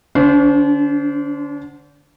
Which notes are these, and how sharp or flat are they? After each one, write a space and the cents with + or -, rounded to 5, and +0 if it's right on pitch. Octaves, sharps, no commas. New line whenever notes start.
D3 +10 D4 -45 C5 -15